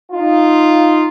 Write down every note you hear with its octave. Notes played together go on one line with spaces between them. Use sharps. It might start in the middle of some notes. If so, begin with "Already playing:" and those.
D#4 F4